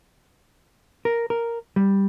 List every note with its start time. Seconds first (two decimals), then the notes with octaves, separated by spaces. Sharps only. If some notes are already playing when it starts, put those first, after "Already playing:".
1.05 A#4
1.30 A#4
1.76 G3